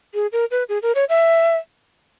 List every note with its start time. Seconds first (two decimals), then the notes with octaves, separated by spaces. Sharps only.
0.14 G#4
0.32 A#4
0.51 B4
0.69 G#4
0.82 A#4
0.95 C#5
1.09 E5